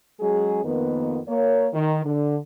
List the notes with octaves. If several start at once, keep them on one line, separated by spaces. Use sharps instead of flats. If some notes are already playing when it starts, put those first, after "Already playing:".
F#3 G#3 C#4 G#4
F2 D#3 A#3 B3
A#3 C#5
D#3
D3